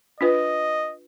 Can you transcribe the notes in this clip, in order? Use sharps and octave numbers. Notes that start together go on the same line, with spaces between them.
D4 F4 B4 D#5